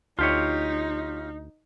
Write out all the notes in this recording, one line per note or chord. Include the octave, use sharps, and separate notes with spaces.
D2 D#4 F4 G4 C#5